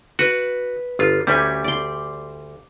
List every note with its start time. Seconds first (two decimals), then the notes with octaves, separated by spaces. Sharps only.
0.19 F#4 B4
0.99 G1 F4
1.27 D2 G3 C#4 G4 G#5
1.64 D5 C6